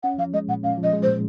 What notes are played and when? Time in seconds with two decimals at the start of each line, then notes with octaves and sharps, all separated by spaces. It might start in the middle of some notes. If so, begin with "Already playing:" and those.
0.03 C#4 F#5
0.18 F3 F5
0.34 G#3 D#5
0.48 A#2 F#5
0.63 C#4 F5
0.78 F3
0.83 D#5
0.93 G#3
1.03 C5
1.08 A#2